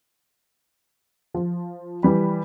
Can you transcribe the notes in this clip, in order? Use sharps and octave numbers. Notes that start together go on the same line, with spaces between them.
F3
E3 G3 B5